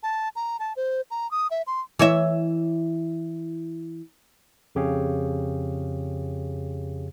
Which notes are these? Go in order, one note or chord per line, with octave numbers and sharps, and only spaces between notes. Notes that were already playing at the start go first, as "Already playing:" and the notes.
A5
A#5
A5
C5
A#5
D#6
E5
C6
E3 C#5 E5
F2 C#3 G4 G#4 C#5 F5